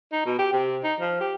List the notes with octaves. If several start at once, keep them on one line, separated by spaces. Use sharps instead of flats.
D#4
B2
G4
C3
D#4
F3
G4